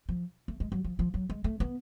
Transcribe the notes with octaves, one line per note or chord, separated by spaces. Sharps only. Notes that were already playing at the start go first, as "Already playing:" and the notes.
F3
A3
G#3
F#3
F3
F3
F#3
G#3
A3
B3